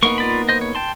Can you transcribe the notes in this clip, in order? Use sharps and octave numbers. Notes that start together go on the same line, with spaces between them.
A#3 B3 D#4 C#6
F4 D5 B5
C5 D#5
C#5
G5 A5 C6